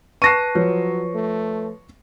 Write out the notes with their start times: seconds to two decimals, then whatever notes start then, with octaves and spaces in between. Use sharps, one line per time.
0.22 B4 A5 C#6 F#6 A#6 C7 D#7 E7
0.55 F3 F#3 B4 C#5
1.15 A3